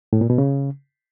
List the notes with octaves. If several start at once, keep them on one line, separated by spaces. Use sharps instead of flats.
A2
A#2
B2
C#3